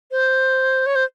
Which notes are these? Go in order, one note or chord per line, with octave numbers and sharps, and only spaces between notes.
C5
C#5
C5